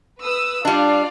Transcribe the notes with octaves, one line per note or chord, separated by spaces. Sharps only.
B4 D#6 E6
G3 D4 F4 D5 F5